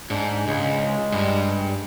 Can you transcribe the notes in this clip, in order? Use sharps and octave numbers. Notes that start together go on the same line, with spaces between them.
G#2 D4
C#2 G#3
G2